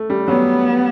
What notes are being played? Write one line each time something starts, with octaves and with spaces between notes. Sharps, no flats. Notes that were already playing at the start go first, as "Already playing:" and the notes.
Already playing: A3
G3
F#3 B3